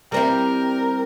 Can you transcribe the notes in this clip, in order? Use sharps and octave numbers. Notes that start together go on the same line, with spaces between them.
G3 C4 E4 A#4